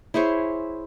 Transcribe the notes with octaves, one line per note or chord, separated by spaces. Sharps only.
E4 G#4 C5 C#5